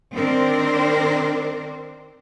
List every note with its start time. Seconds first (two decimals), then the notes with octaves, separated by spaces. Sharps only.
0.14 D#3 C4 D4 A#4 C5